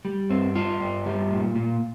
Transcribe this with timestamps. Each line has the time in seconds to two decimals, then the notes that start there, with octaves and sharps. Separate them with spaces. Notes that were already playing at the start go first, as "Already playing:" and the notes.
0.05 G3
0.30 G2 C4
0.55 G3 F4
0.80 G2
1.06 G3
1.31 A#2
1.55 A#2